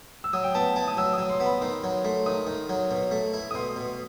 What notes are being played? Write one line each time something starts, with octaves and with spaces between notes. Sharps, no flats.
E6
F#3 D#6
G5
B3 A5
E4 A5
D#6
F#3 E6
D#6
F#3
C6
B3
B5
D#3 C6
F#3
A3 C6
D#3 D#6
D#3
F#3
B2
A3
E4
D#6
B2 C6
B2